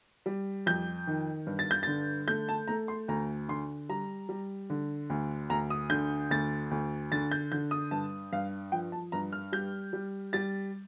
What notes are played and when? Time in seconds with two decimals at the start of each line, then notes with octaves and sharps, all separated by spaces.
0.26 G3
0.66 F2 G6
1.07 D#3
1.47 G2
1.59 A6
1.71 G6
1.83 D3 A6
2.28 A3 G6
2.49 A5
2.68 A3 A#5
2.88 C6
3.08 D2 A#5
3.49 D3 C6
3.89 G3 A#5
4.29 G3
4.70 D3
5.10 D2
5.50 D2 A#5
5.70 D#6
5.90 D3 G6
6.30 D2 A6
6.71 D2
7.12 D3 A6
7.31 G6
7.52 D3 G6
7.71 D#6
7.91 G2 A5
8.33 G2 F5
8.72 F3 G5
8.92 A5
9.12 G2 A#5
9.32 F6
9.52 G3 G6
9.93 G3
10.33 G3 A6